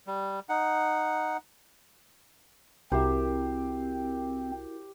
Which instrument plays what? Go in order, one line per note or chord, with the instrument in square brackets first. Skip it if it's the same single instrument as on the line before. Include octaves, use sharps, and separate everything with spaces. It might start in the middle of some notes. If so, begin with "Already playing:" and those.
[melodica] G3
D#4 F#5
[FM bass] C2 [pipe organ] C4 [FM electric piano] E4 F#4 A#4 [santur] G4 C5